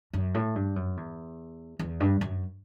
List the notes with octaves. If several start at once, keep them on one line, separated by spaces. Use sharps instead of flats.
F#2
A2
G2
F#2
E2
E2
G2
F#2